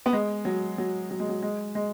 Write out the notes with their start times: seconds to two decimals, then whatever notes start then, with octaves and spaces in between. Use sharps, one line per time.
0.06 B3
0.13 G#3
0.45 F#3
0.78 F#3
1.10 F#3
1.20 G#3
1.29 F#3
1.42 G#3
1.75 G#3